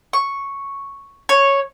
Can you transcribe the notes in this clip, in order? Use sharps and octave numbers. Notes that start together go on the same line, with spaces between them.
C#6
C#5